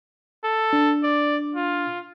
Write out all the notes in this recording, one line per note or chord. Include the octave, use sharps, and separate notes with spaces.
A4
D4
D5
F4